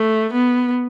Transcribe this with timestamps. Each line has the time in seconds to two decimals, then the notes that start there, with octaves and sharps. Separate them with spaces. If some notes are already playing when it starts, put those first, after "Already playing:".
Already playing: A3
0.33 B3